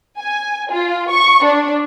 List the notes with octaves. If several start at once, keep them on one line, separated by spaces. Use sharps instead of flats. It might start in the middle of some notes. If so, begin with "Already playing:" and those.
G#5
F4
C#6
D4